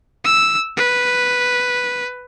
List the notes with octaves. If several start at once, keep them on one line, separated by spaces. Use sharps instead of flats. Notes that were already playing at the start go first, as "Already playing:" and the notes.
E6
B4